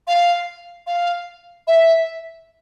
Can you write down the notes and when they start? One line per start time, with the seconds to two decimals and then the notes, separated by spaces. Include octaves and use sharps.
0.07 F5
0.87 F5
1.67 E5